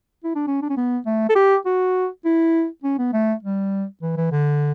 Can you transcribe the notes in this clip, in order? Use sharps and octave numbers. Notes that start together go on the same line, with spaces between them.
E4
D4
C#4
D4
C#4
B3
A3
A4
G4
F#4
E4
C#4
B3
A3
G3
E3
E3
D3